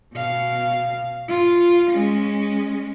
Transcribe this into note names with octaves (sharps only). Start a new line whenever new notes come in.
B2 F5
F4
G#3 C#4